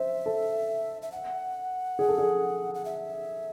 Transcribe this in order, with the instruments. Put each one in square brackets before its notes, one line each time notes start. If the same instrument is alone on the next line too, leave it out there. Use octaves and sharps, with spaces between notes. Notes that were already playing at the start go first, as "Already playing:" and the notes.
Already playing: [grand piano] C5 [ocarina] E5
[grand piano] A4
[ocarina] E5
F#5
[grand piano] G#4
A4
G#4
[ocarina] F#5
E5